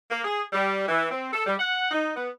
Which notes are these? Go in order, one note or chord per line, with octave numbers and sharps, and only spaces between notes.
A#3
G#4
G3
E3
C4
A4
G3
F#5
D#4
B3